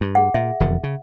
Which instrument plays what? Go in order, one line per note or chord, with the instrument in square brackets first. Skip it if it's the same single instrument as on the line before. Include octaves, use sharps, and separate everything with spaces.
[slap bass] G2
[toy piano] G#4 F#5
[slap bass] A#2 [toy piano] E5
[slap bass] E1 F2 D3
C#3